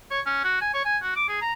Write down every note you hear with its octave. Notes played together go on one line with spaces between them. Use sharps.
C#5
C#4
F#4
G#5
C#5
G#5
F#4
D6
G#4
A#5